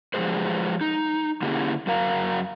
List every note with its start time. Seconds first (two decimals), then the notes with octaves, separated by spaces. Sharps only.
0.14 F3 F#3 G#3 G4 G#4 C5
0.81 D#4
1.42 D3 A#3 C#4 E4 G4 G#4
1.87 F#2 F#3 A#4 F5 A#5